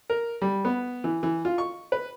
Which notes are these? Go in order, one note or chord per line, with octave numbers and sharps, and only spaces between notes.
A#4
G3
B3
E3
E3
F4
C#6
B4